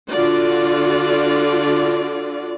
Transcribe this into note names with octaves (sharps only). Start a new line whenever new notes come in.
D3 F4 F#4 D5